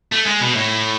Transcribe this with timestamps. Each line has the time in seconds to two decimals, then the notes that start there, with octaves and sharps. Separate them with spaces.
0.12 A3
0.26 G#3
0.41 B2
0.55 A2